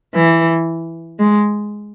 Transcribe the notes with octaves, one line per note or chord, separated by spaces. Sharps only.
E3
G#3